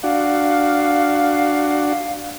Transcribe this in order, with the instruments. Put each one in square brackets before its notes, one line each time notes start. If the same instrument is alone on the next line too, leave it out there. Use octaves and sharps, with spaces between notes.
[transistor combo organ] D4 F#4 [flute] F5